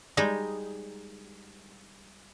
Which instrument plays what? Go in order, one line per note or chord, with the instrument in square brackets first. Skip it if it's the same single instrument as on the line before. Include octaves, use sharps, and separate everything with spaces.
[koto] G3 G#3 D#4